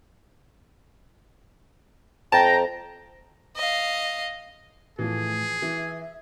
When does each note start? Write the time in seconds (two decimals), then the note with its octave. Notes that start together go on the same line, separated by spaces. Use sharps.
2.32 F2 G5 A5 A#5
3.56 D#5 F5
4.99 A2 E3 F3 G#4
5.62 E3 E5